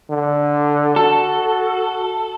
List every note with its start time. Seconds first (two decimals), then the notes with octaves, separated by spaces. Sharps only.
0.10 D3
0.96 F#4 A4